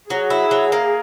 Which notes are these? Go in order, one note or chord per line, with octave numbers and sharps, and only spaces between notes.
F#3 G#4
E4
F#3
A#3